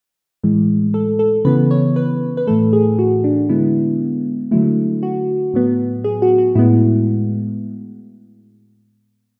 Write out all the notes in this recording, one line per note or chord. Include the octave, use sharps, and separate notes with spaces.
A2 E3 G#3
A4
A4
C#3 E3 B3 B4
C#5
B4
B4
A2 E3 A3 A4
G#4
F#4
D4
D3 G#3 B3 E4
D3 F#3 A3 E4
F#4
A2 F#3 B3
G#4
F#4
F#4
A2 G#3 B3 E4